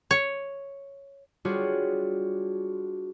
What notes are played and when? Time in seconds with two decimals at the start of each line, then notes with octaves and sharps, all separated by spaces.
0.11 C#5
1.45 G3 D4 F4 F#4 G#4 C#5